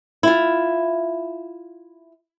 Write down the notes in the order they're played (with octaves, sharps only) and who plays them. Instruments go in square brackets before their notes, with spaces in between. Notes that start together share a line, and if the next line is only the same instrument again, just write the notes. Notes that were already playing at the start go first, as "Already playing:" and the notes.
[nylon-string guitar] E4 F4